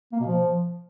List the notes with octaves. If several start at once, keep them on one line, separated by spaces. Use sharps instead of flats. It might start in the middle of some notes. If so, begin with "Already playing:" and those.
A#3
B2
F3